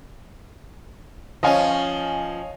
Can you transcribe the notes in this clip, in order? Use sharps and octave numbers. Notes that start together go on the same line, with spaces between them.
F3 C#4 D#5 F5 G#5